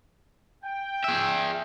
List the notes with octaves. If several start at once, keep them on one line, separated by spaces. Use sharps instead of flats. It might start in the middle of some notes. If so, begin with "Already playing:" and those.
G5
G#4 E5